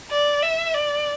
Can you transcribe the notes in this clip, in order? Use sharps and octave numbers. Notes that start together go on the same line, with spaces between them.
D5
E5
D5